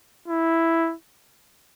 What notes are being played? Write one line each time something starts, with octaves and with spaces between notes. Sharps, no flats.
E4